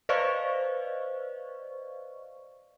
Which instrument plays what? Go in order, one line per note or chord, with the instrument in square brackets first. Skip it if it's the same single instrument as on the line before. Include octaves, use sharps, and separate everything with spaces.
[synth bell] B4 C5 D5 D#5 F5 C#6